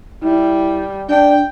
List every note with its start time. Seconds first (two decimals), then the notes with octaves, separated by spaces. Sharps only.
0.23 G3 E4
1.09 D4 G5